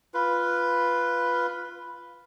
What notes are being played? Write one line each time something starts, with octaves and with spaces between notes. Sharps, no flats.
F4 B4